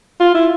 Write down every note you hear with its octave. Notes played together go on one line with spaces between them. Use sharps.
F4
E4